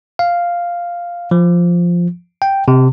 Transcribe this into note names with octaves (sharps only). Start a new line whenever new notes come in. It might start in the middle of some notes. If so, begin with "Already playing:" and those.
F5
F3
G5
C3